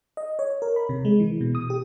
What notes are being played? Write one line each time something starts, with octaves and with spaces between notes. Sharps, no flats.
D#5
C#5
A#4
B5
C3
G#3
E3
B2
D#6
G4